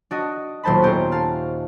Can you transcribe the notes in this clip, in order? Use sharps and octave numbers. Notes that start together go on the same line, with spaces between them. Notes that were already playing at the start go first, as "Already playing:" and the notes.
D4 F#4 D#5
D#1 B1 C5 A5 B5
B3 C#4 G4 A4 C5 A#5
F5 A5 F6